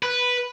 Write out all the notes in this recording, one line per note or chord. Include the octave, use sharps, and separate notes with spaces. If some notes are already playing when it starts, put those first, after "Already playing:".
B4